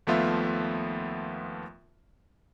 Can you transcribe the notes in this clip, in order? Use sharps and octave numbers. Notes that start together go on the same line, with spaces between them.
D#2 F3 A3 B3 F4 E5